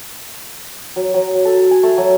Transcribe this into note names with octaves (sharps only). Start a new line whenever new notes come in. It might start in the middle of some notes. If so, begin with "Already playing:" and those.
F#3
F#3
A4
G#5
A3
F#3